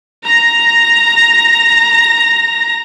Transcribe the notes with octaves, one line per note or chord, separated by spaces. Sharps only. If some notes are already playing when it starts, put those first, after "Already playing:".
A#5 A#6